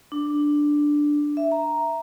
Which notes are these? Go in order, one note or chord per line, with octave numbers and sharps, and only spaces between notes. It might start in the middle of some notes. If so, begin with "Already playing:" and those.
D4
E5
A#5